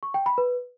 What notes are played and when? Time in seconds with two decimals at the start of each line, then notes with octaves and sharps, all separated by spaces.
0.03 C#6
0.14 G5
0.26 B5
0.38 B4